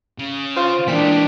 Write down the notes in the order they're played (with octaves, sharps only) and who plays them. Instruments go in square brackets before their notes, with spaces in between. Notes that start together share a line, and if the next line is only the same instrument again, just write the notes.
[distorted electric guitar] C#3
[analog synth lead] F4 [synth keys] C5 F5
[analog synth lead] A#2 [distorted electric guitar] E3 G#3 [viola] D4 G5 [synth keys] B6